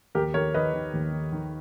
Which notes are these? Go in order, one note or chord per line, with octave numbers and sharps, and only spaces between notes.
D#2 G4 A#4
D#3 A#4 C#5
D#3 B4 D#5
D#3
D#2
D#3
D#3